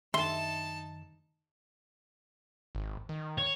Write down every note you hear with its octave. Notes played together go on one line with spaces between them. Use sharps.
F#2 D#3 D#4 E5 A5 C6
G#1
D#3
C#5